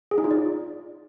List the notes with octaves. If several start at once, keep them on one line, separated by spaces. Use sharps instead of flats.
G#4
D#4
F4
D5